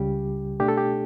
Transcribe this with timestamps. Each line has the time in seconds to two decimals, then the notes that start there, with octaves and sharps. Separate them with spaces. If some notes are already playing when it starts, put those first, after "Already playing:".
Already playing: C#2 C#3 G3 G4
0.60 B2 A3 D4 G4
0.68 A4
0.78 G4